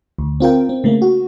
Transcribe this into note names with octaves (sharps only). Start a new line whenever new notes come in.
D2
C4 F4 A#4 G5
C4
C#3 A3 A#3
F#4